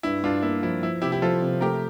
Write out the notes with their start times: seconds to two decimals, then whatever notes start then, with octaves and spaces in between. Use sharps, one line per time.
0.03 G2 E4
0.23 G2 D4 F4
0.42 A#3 E4
0.63 F3 E4
0.82 F3 E4
1.02 C3 E4 G4
1.12 E4 G4
1.22 F3 F4 A4
1.42 C3
1.61 A3 G4 A#4